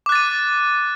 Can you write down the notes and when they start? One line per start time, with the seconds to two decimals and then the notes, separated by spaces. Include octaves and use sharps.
0.06 D6
0.09 F#6
0.12 A6
0.15 D#7